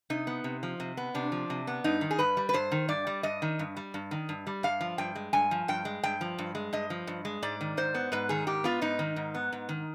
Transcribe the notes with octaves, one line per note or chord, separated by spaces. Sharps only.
C3 D#4
B3
C3
F3
C3
B3
C3 D4
F3
C3
B3
G2 D#4
D#3
G#4
G2 B4
G3
B4
G2 C5
D#3
G2 D5
G3
G2 D#5
D#3
G2
G3
G2
D#3
G2
G3
G2 F5
F3
G2 G5
G#3
G2 G#5
F3
G2 G5
G#3
G2 G5
F3
G2
G#3
G2 D#5
F3
G2
G#3
G#2 D5
D#3
G#2 C5
B3
G#2 B4
D#3 G#4
G#2 G4
B3 F4
G#2 D#4
D#3
G#2
B3
G#2
D#3